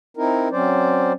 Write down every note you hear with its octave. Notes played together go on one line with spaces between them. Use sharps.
C4 D#4 E4 A#4
F#3 C4 C#4 C5 D5